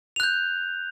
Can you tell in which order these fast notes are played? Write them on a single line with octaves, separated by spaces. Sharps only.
F7 F#6 G6